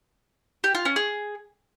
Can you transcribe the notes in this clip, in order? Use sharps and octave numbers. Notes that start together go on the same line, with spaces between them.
G4
F4
C#4
G#4